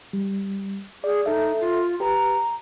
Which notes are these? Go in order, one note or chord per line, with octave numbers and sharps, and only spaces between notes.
G3
G#4 D5
D#4 A4 E5
F4
G4 B4 A#5